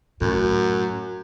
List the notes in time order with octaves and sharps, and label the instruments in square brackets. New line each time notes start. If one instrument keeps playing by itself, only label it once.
[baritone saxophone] F#2 [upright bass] A2